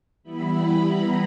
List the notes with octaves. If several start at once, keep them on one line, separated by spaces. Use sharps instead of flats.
E3 G3 B3 E4 B5
A#5